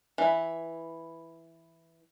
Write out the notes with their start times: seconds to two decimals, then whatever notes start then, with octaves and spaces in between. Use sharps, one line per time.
0.18 E3 E4